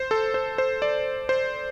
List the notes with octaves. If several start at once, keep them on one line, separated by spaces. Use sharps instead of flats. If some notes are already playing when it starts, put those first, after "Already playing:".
Already playing: C5
A4
C5
C5
D5
C5